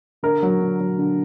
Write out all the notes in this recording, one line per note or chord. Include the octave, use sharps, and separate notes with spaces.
D3 A#4
F#3
D3
F#3
D3